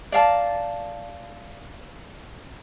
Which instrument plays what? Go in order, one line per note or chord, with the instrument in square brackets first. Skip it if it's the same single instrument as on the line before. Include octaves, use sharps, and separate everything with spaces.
[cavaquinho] D5 F5 A5 A#5